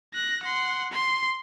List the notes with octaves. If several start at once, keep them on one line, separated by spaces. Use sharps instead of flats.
F#6 A#6
F#5 C6
C6